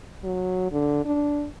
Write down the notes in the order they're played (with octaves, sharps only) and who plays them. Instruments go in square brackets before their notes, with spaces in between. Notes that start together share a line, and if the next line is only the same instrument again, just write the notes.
[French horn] F#3
D3
D4